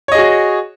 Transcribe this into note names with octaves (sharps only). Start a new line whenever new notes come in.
F#4 G#4 C#5 D#5